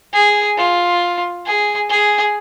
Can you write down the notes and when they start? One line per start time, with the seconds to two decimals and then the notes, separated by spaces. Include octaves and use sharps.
0.13 G#4
0.58 F4
1.45 G#4
1.89 G#4